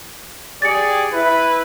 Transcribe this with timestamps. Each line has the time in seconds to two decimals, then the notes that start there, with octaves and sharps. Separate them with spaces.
0.62 G4 G#4 D5 A6 C#7
1.12 E4 B4